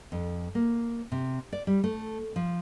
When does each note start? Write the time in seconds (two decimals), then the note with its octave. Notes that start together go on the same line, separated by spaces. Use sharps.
0.12 F2
0.55 A#3
1.12 C3
1.53 D5
1.67 G3
1.84 A3
2.36 F3